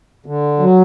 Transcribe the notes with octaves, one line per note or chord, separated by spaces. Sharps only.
D3
F#3